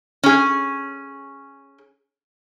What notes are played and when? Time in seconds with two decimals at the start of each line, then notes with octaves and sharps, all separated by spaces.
0.23 C#4 G#4